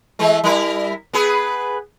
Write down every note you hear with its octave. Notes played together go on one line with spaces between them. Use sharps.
E3 G#3 A3
G3 E4 A#4
B3 G#4 B4